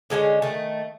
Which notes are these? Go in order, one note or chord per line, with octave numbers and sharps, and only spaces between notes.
D3 G#3 A3 C#4
D#3 A3